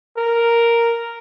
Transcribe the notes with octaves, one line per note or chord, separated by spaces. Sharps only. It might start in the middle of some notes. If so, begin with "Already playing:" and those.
A#4